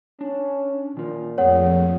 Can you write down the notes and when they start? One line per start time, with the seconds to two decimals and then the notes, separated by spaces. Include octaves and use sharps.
0.21 C#4 D4
0.97 A#2 D#3 F4
1.38 F2 A3 C4 G#4 C#5 F#5